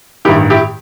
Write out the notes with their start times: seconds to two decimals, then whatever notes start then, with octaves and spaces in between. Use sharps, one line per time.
0.25 A1 G2 D#3 E4 G4
0.50 E4 G4